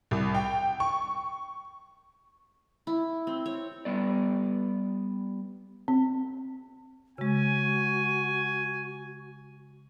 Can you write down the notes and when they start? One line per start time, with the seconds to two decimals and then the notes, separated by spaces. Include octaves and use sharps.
0.11 C2
0.35 G5
0.80 C#6
2.87 E4
3.27 C4
3.46 C#5
3.85 G3 B3 D5
5.88 C4
7.18 C#3 G#3 F#4 G#5